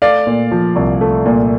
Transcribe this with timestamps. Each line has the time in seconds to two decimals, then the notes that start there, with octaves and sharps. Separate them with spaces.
0.02 A3 D5 F5
0.27 A#2
0.51 F3
0.76 C2
1.01 A3
1.26 A#2